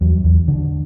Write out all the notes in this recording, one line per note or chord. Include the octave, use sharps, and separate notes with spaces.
E2 F#3
E2
D3